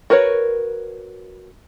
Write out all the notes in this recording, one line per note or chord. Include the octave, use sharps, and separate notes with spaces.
F#4 A#4 B4 C#5